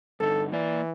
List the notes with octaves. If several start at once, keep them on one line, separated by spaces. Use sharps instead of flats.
G2 D3 D#4 A4
E3 A#3 D5